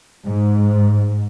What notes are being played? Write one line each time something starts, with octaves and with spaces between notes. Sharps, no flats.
G#2